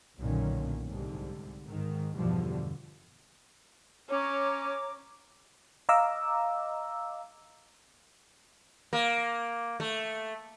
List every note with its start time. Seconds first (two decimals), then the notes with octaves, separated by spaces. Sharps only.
0.17 B1 F#2 A#2 D3 D#3 C#4
0.85 C2 G#2 D3 G3
1.66 G#2 D#3
2.14 E2 G2 B2 D3 F3 G3
4.10 C#4 C#5 A#5 D6
5.89 D#5 F5 A#5 D6 E6
8.93 A#3
9.80 A3